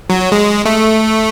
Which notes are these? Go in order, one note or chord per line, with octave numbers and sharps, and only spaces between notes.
F#3
G#3
A3